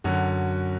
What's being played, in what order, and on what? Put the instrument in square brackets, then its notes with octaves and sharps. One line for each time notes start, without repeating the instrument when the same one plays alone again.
[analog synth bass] F#2 [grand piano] D3 F#3 C#4 F#4